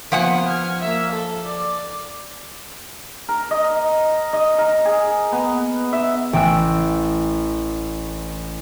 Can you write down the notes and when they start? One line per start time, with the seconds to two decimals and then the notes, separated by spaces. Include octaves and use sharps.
0.12 F3 A#3 B3 F#5 G#5
0.47 F6 G#6
0.81 A#3 E5
1.12 A4
1.45 D5
3.29 A#4
3.51 D#5
4.33 D#5
4.58 A#4
4.85 G#4
5.32 B3
5.93 E5
6.33 A1 G5 E6 F#6